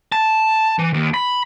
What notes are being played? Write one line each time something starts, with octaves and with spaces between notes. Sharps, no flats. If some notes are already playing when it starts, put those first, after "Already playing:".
A5
E3
D#2
B5